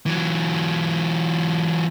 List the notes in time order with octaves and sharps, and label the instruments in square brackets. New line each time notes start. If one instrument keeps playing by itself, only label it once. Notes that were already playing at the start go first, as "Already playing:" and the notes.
[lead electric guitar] E3 F#3